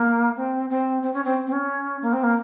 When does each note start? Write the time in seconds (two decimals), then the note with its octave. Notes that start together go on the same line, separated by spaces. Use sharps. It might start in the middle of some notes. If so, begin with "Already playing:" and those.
Already playing: A#3
0.36 C4
0.70 C4
1.02 C4
1.13 C#4
1.24 C4
1.46 C4
1.52 C#4
2.02 A#3
2.13 C4
2.23 A#3